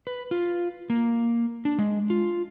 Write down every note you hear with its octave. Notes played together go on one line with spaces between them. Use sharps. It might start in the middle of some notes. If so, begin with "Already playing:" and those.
B4
F4
A#3
D4
G#3
F4